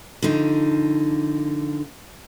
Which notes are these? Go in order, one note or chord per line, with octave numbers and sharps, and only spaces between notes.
D3 D#3 F3 D#4